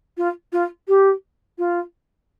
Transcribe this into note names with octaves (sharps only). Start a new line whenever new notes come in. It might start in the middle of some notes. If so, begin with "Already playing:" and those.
F4
F4
G4
F4